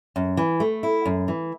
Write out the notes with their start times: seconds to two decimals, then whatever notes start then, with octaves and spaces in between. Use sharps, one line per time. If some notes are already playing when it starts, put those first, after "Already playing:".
0.16 F#2
0.37 E3
0.60 A3
0.83 E4
1.06 F#2
1.28 E3